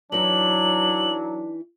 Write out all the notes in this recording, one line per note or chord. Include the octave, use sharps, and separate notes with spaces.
E3 F#3 D4 D#4 F#7